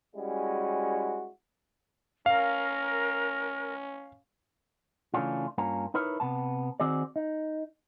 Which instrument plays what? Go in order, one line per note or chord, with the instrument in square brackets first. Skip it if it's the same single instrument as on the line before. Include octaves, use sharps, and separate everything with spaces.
[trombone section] G3 G#3 C#4 E4 F#4
[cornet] C#4 [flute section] A#4 [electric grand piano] F5
[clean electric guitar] C#3 E3 A3 C#4 D4 F4
G2 A#3 C#4 F4 A#5
D#4 E4 A#4 B4 C#5
C3 B3 A5
D#3 C4 F#4 G#4 D5
D#4